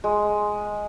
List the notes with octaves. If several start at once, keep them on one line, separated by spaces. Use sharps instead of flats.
G#3